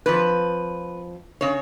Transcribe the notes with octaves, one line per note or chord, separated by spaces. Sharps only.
F2 F3 B4
C#3 C#5